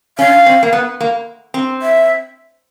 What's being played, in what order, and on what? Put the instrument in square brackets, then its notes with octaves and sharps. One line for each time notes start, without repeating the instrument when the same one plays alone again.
[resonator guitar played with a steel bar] C#4 [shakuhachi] F5
[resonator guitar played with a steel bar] C4
A#3
B3
A#3
C4
[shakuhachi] E5